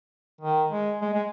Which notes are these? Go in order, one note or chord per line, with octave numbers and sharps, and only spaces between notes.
D#3
G#3
G#3
G#3